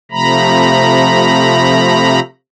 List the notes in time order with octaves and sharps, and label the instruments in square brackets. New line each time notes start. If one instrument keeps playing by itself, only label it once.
[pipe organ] C3 F3 A3 A#5 B5